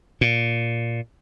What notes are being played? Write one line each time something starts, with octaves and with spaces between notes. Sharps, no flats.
A#2